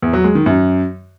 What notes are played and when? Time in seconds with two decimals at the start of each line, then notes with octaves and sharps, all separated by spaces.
0.02 E2
0.13 F#3
0.24 G#3
0.35 D#3
0.46 F#2